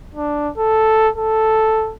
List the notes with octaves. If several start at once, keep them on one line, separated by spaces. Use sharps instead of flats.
D4
A4
A4